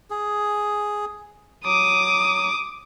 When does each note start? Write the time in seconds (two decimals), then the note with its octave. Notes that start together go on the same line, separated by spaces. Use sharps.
0.10 G#4
1.65 F#3 D6 D#6